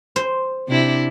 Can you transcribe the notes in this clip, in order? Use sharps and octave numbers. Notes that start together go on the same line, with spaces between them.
C5
C3 D4 E4